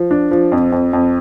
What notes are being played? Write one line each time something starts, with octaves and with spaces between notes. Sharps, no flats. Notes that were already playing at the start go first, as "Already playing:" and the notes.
Already playing: F3
D4
F3
F2
F2
F2